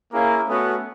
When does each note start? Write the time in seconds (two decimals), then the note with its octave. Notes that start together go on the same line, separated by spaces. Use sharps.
0.13 A#3 C#4 E4 G#4
0.48 A3 B3 C#4 F#4